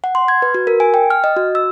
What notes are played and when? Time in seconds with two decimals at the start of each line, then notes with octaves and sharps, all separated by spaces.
0.04 F#5
0.15 C6
0.28 G#6
0.42 B4
0.54 F#4
0.67 A#4
0.80 G#5
0.94 G5
1.10 F6
1.24 D#5
1.37 F#4
1.55 E6